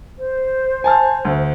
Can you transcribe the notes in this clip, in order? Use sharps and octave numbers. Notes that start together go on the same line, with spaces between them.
C5
G#5 A5 F6
D2